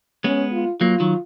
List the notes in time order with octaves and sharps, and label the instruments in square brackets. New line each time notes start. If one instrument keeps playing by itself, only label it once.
[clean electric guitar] G#3 B3 [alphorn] C#4
[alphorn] F4
[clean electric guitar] F#3 A#3 [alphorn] F4
[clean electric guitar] D#3 F#3